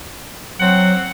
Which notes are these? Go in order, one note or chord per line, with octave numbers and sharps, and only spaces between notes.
F#3 C4 F#5